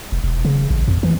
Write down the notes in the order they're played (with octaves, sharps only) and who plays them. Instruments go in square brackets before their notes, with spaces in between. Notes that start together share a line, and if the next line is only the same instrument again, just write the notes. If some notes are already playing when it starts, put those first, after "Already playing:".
[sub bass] E1
E1
C#3
A1
F2
E3